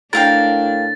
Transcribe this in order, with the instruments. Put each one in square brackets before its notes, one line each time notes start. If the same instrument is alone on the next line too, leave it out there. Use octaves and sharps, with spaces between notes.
[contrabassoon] A2 [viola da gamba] D4 [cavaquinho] A#4 F5 G5 [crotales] A6